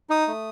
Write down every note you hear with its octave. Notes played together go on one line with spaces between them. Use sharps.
D#4 D#6
A3